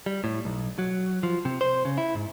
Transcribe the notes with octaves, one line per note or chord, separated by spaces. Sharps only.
G3
A2
B1
F#3
F3
C3
C5
C#3
E4
G#2